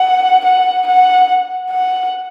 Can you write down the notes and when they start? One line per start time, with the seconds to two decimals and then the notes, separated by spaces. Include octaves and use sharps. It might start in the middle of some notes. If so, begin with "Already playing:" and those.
Already playing: F#5
0.45 F#5
0.87 F#5
1.70 F#5